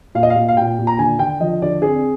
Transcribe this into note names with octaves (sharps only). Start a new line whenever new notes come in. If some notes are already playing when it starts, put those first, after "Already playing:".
A#2 F5
D#5
F5
A#2
F5
A#2 G5
A#2
A#5
D3 G#5
D3 G5
F3 D#5
D3 D5
C4 G#4